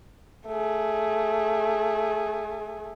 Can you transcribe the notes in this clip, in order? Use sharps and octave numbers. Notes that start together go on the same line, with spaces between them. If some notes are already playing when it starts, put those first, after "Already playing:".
A3 G#4